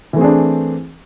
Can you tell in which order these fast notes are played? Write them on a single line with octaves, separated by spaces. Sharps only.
E3 A3 C4 G#4 D4